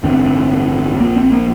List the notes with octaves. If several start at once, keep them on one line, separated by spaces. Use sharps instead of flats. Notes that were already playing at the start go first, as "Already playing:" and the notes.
A1 G2 D3 C4
A#1 A#2 A#3
C4
A#3